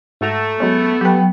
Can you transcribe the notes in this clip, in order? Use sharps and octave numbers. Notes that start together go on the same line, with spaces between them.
G#2 A3 F#4 A#5
F#3 G#3 B3 C#4
F#3 G4 B4 G5